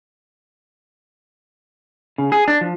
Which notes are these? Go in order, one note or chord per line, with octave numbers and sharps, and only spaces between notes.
C#3
G#4
D4
F3